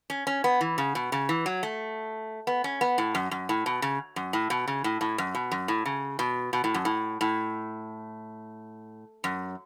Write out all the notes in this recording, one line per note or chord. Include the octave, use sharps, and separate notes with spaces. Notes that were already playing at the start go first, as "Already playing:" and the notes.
C#4
C#4
B3
E3
C#3
B2
C#3
E3
F#3
A3
B3
C#4
B3
A2
F#2
F#2
A2
B2
C#3
F#2
A2
B2
C#3
A2
A2
F#2
B2
F#2
A2
C#3
B2
B2
A2
F#2
A2
A2
F#2